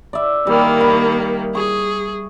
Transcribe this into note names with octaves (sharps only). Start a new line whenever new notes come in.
D5 E5
D#3 G3 A#3
B5
G#4 C#6